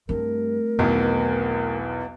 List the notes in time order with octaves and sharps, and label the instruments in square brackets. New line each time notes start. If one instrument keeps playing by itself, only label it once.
[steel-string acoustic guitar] G2 [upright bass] A3 C4 [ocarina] A#4
[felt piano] B1 E2 D#3 [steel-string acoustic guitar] B3